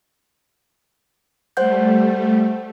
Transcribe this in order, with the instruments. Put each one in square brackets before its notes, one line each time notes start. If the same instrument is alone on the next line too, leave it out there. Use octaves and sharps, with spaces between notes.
[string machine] G3 A3 [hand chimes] C5 F#5 G6